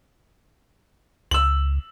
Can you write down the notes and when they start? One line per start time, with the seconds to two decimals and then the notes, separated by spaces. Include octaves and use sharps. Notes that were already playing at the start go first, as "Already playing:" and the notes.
1.31 C#2 E6 F#7